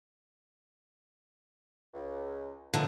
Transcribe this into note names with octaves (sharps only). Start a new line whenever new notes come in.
C#2
F#2 D3 E3 F3 D#4